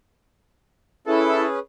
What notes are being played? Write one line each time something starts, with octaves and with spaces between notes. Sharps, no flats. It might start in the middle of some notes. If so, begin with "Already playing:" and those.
C#4 E4 G#4 A4 B4